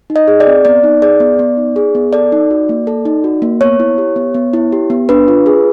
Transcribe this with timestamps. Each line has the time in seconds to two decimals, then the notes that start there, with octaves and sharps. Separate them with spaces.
0.10 D#4
0.16 D#5
0.28 G#4
0.40 D5
0.47 C4
0.65 B3 D5
0.84 D#4
1.02 G#4 D5
1.20 B3
1.39 B3
1.57 D#4
1.76 G#4
1.95 B3
2.13 A4 D5
2.32 D#4
2.51 F#4
2.69 A#3
2.87 A4
3.05 D#4
3.24 F#4
3.42 A#3
3.61 B3 C#5
3.80 E4
3.98 G4
4.16 B3
4.34 B3
4.53 E4
4.72 G4
4.90 B3
5.09 D4 B4
5.28 F4
5.46 G#4